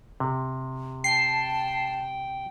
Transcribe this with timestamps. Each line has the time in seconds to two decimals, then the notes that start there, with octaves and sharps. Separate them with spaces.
0.20 C3
1.04 G5 A5 C7